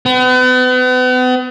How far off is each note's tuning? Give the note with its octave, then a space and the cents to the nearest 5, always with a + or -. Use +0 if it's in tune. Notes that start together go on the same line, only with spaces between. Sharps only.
B3 +40